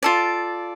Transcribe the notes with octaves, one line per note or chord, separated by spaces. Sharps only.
F4 A4 D5